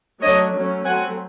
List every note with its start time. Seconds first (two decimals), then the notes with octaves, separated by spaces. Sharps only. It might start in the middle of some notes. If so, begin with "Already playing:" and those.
0.21 F#3 A3 D4 C#5 D#5
0.53 F#3 A3 C#4
0.84 F#3 A3 C4 F#5 G#5